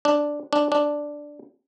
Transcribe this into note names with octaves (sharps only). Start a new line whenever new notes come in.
D4
D4
D4